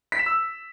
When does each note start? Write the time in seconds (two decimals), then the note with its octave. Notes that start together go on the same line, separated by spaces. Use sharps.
0.12 B6
0.19 E7
0.26 E6